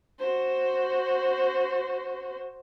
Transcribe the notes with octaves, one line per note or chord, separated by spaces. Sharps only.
F#4 C5